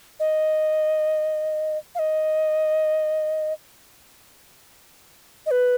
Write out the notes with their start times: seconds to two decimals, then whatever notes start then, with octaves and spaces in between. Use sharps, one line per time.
0.20 D#5
1.95 F5
1.99 D#5
5.46 D#5
5.51 B4